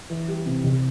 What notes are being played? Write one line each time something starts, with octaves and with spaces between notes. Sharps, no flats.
E3
G3
C3
C2